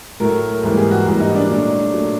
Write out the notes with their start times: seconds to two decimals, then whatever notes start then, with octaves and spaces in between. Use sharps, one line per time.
0.20 A2 F#3 A3 A#4
0.63 G#2 E3 G3 A#3
0.77 G#4
0.91 F#4
1.06 G#2 E3 G3 A#3
1.20 D#4
1.35 D4
1.49 A#2 F#3 A3
1.92 A#2 F#3 A3